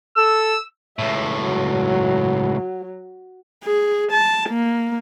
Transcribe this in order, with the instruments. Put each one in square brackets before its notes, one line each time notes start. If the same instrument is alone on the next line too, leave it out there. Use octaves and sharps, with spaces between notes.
[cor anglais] A4 [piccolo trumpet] E6
[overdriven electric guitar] C#2 A2 [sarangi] E5
[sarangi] F#3
[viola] G#4
A5
A#3